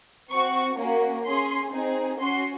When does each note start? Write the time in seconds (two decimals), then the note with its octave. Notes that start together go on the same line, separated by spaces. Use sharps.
0.30 C4 F#4 C#6
0.78 A#3 C#4 F#4
1.25 C#4 G#4 C6
1.72 C4 D#4 G#4
2.19 C#4 F#4 C6